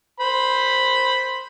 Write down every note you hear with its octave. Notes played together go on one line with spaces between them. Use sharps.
C5 B5